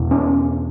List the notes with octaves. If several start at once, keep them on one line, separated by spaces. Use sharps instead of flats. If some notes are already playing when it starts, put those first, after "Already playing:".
Already playing: E2 B2
C#4